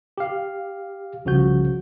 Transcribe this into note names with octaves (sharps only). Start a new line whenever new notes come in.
G4 F5
C2 C#3 F3 F#4 G6